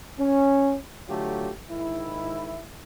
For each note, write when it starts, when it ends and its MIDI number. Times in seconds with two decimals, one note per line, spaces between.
0.19 0.77 61
1.08 1.50 50
1.08 1.50 54
1.08 1.50 57
1.08 1.50 65
1.08 1.50 67
1.71 2.63 44
1.71 2.63 51
1.71 2.63 64